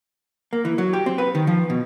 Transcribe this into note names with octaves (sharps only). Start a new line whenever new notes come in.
A#3
E3
F#3
G4
C4
B4
D#3
F3
B2